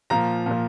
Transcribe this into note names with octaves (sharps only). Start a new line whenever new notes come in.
A#2 F3 A#5
A#2 F3